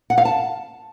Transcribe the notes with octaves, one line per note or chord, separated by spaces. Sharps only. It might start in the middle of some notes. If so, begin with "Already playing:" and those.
F#5
F5
A5